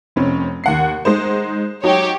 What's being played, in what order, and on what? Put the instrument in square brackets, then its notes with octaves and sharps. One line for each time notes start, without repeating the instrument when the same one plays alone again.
[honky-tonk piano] F1 C4 C#4
D#2 F#5 C7
G#3 D#4 C5
[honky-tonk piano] F#3 D#4 [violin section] G4 C#5